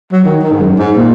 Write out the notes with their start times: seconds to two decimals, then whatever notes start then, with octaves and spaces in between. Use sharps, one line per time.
0.12 F#3
0.24 D#3
0.42 D#3
0.52 G#2
0.60 F#2
0.78 G#2
0.96 A#2